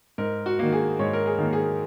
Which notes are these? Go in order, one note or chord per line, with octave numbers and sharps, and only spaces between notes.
G#2 A#4
F#4
D#3 A#3
G#4
G#2 C#5
A#4
G#4
D#3 A#3
G#4